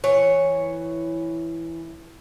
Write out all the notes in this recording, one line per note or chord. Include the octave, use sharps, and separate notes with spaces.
E3 C#5